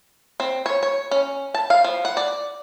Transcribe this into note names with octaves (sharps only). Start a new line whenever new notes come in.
C4
C#5
C#5
C#4
A5
F5
F3
F#5
D5